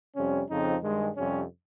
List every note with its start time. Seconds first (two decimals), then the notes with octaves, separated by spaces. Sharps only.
0.15 F2 C3 G3 C#4
0.49 F2 C#3 F3 C4 D#4
0.82 G2 D#3 G#3
1.16 F2 C3 G3 C#4